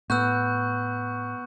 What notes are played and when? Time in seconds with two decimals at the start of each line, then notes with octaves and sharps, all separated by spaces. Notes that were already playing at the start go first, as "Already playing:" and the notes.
0.10 A2 B3 C#6 E6 F#6 G6